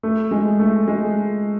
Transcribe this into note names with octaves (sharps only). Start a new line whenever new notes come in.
A3
G#3
A3
G#3